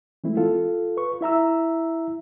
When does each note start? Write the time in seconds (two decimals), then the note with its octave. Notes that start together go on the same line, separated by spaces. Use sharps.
0.24 E3 G#3 A3 C4 E4
0.37 F4 A4 F5
0.97 B4 C#6
1.21 E4 E5 A#5 E6